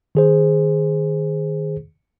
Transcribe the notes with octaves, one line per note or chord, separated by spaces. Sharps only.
D#3 G#4 C5